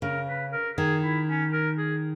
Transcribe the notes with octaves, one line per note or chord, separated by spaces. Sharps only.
C#3 A#4
B4
A#4
D#3 G#4
E4
C#4
A#4
G#4